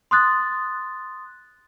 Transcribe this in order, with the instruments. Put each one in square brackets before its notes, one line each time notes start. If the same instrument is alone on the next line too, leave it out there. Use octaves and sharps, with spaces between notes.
[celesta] C6 D#6 F#6 A6